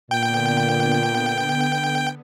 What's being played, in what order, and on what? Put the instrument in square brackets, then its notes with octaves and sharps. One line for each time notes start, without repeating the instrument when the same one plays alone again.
[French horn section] A#2 [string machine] D3 B3 [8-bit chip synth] G5